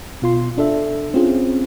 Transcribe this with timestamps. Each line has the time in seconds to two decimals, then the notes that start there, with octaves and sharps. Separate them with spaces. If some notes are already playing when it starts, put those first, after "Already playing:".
0.22 B2 F4 C6
0.58 D4 A4 E5
1.14 C4 C#4 F4 G#4